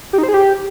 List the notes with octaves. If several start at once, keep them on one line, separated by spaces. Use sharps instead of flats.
G4
D#4
C5
G#4
G4